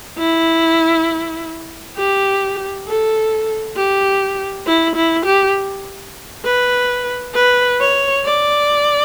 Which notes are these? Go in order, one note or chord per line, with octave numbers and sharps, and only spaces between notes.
E4
G4
A4
G4
E4
E4
G4
B4
B4
C#5
D5